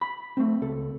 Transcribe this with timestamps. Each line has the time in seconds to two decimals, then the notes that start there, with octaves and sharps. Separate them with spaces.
0.01 B5
0.37 A3 C4
0.62 C#2 A4